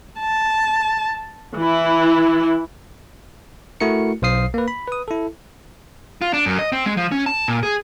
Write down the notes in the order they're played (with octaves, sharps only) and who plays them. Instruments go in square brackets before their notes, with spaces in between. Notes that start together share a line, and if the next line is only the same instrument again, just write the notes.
[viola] A5
E3 E4
[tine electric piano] A3 E4 F#4 A#4 C#7
B1 C5 F5 D#6 C7
A#3 B4
B5
B4 D#6
E4 A4
[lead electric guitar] F4
D4
F#2
D#5
C4
G#3
F3
C#4
A5
A#2
G#4